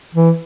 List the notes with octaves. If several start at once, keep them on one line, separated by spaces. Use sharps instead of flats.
E3